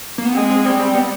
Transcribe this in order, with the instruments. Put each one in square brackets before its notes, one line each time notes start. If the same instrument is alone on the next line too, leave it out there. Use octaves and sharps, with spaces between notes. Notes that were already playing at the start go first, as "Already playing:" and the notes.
[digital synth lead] A#3
B3
[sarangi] G#3 [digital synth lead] C4
[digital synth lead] C4
[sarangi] G3 [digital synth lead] C4
[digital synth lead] C4
B3